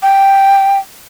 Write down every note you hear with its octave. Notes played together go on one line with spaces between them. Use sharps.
G5